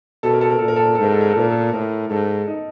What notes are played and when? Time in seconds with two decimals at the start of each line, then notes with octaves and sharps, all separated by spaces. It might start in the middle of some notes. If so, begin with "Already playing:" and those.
0.23 B2 A4
0.33 A#4
0.41 A4
0.50 A#4
0.58 A#2 A4
0.68 A#4
0.76 A4
0.85 A#4
0.95 G#2 A4
1.04 A#4
1.12 A4
1.21 A#4
1.30 A4
1.36 A#2 A#4
1.48 A4
1.73 A2 A#4
2.10 G#2 A4
2.47 D#4